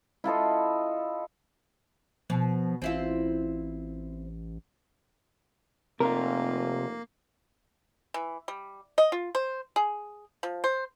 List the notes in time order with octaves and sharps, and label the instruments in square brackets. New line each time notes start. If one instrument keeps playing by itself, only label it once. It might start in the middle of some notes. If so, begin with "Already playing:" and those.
[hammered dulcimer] E4 F4 A4 D#5
[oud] B2 [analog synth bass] F3
[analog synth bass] A1 [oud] C4 E4 F4
[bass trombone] F1 [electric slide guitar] C3 F4 [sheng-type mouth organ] A#3 [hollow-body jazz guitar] A#4
[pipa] E3
G3
D#5
F4
C5
G#4
F3
C5